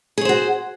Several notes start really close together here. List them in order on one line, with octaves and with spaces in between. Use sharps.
G#4 C#5 C5 F#4